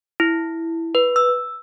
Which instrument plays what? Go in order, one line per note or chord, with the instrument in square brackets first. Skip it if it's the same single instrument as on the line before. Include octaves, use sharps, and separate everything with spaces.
[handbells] E4
B4
E6